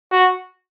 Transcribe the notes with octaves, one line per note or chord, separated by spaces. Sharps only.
F#4